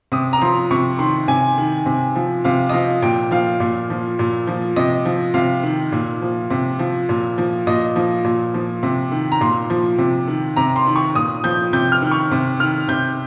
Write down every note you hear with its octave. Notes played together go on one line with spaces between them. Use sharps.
C3 D#6
A#5
F3 C6
C3 C#6
D#3 C6
C3 G#5
D#3
C3
F3
C3 F5
D#5
F3 F5
A#2 G5
F3 F5
A#2
F3
A#2
F3
C3 D#5
F3
C3 F5
D#3
A#2
F3
C3
F3
A#2
F3
A#2 D#5
F3
A#2
F3
C3
D#3
A#5
A#2 C6
F3
C3
D#3
C3 A#5
C6
D#3
C#6
A#2 D#6
F3 G6
C3 G6
F6
D#3
C#6
C3
D#3 F6
C3 G6